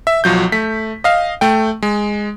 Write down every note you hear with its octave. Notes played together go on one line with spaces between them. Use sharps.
E5
B1 F3 F#3 G6
A3 B6
D#5 F5
A3 G5
G#3